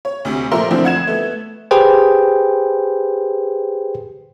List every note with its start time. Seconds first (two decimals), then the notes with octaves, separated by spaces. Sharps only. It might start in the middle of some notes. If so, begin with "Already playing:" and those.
0.05 C#5
0.25 D2 C3
0.51 A#2 F3 A3 A#4 E5 C6
0.71 D3 E3 F3 A3 C4
0.84 F2 F#5 G#6 E7
1.07 A3 B3
1.71 G4 G#4 B4 C5 G5